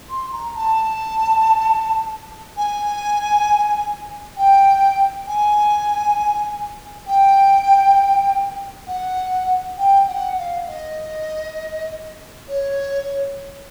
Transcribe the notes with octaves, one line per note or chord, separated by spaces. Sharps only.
C6
A#5
A5
G#5
G5
G#5
G5
F#5
G5
F#5
F5
D#5
C#5